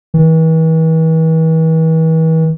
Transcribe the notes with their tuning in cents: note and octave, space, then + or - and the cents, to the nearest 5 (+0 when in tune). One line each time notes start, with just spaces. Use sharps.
E3 -40